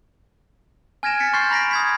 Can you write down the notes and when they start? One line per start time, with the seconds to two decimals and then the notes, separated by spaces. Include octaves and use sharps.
1.03 G#5 F6 G#6 A#6 D7 E7
1.20 F6 A6 B6 C#7
1.33 C6 C#6 F6 G6 A6 C7
1.51 A#5 B5 A#6 B6 D7
1.71 D#6 G#6 B6